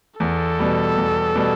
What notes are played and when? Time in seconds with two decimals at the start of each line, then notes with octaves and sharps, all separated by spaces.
0.20 E2 A4
0.59 B2 G3
0.98 E2
1.36 B2 G3